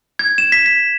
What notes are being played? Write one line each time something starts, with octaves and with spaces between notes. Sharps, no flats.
G#6
E7
B6
B6